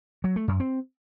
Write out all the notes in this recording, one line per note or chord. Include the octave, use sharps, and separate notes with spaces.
F#3
A3
F#2
C4